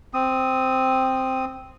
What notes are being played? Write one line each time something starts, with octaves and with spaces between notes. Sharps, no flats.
C4 D#6